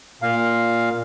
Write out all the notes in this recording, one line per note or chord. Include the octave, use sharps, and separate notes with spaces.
A#2 F5